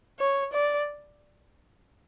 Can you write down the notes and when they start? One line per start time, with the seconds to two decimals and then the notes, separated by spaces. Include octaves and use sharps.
0.19 C#5
0.53 D5